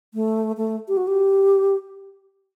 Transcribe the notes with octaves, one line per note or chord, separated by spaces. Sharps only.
A3
A3
G4
F#4
G4